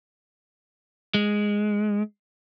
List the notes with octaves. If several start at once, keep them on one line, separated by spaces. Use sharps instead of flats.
G#3